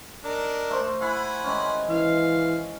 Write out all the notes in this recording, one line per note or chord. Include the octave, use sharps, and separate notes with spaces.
D4 D#4 A#4
A3 C5
E4 F#5 G#5 B5
D#3 G#3 C#4
E3 F5